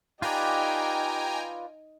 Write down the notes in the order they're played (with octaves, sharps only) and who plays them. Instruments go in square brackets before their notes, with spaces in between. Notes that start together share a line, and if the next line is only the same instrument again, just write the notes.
[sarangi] D#4 [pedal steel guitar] F4 B4 D5 [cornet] G4 [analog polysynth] G5 G#5 A#5